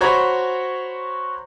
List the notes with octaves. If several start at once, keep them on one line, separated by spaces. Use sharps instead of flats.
F#4 C5 C#5 A#5 B5 G#6